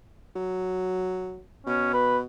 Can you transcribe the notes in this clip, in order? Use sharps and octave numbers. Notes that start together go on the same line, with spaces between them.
F#3
B2 C#4
B4